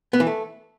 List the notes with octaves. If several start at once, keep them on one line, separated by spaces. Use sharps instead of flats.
B3
E3
A3